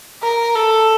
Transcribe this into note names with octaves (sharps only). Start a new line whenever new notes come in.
A#4
A4